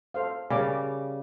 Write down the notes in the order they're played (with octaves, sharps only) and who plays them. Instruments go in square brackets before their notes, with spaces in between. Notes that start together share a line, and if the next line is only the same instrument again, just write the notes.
[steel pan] A4 C5 F5
[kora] C#3 G3 C#4 [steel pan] A#4 D5 D6